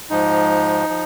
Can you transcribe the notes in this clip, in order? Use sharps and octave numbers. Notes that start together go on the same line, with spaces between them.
G#2 F3 D#4
F3